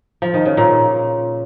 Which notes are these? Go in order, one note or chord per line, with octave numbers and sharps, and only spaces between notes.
F3
D#3
C#3
A#2